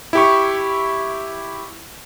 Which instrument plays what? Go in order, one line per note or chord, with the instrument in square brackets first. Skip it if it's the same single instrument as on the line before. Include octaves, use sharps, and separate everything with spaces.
[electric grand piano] E4 G4 C#6